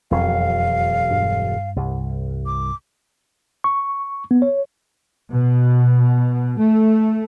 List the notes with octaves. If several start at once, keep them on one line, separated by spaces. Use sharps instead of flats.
E1 F2 F#3 F5
G2
C2
D6
C#6
B3
C#5
B2
A3